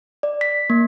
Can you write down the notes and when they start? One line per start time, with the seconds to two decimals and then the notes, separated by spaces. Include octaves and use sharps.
0.23 D5
0.41 B6
0.70 A#3